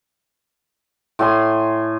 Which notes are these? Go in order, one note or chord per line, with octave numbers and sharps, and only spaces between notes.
A2 G#5 C6